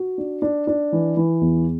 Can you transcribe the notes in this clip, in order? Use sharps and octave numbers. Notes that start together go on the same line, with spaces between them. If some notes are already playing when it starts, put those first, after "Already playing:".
Already playing: F#4
D4
D4
D4
E3
E3
E2